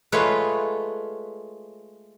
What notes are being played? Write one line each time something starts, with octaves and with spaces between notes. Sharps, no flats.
G#3 A3 F4 B4 C#5